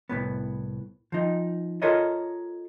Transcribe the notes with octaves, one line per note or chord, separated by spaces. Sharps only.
C2 A2 B3
F3 D#4
F4 A4 A#4 C#5 D#5